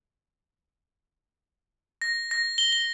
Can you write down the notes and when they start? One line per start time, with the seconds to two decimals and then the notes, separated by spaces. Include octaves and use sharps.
2.02 A#6
2.31 A#6
2.58 G7
2.73 G7